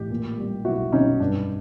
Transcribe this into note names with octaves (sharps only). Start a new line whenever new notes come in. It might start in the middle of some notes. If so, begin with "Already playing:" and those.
Already playing: A1 G4
A#2
G3
B1 E4 F#4
B1 C#4 D#4
G2 D4